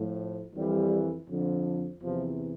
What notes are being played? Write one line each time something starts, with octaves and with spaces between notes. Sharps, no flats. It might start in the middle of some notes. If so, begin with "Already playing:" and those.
Already playing: A2 F3
F2 E3 G3
F2 D3 F3
E2 C3 E3 F3